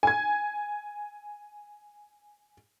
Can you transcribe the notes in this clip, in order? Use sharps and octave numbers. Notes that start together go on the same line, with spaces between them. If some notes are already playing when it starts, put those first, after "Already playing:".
G#5 G#6